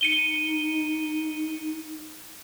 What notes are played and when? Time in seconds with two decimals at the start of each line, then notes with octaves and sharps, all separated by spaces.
0.01 D#4 C#7 D#7 G7